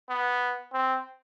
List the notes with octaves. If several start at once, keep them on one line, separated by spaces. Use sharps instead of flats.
B3
C4